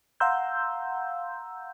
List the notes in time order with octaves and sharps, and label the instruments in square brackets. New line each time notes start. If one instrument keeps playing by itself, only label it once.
[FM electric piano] F5 F#5 A#5 C6 E6 G6